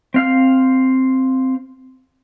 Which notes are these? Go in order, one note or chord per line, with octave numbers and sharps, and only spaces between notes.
C4 F5 F6